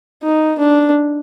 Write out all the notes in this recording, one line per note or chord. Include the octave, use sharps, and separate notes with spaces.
D#4
D4